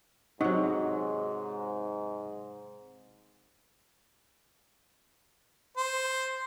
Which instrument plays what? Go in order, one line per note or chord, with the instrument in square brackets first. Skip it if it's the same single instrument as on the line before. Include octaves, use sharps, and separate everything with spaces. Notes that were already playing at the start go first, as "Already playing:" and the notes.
[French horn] G#2 [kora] C3 F#3 [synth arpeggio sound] D#4 [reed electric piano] D#5 F#5 C#6
[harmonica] C5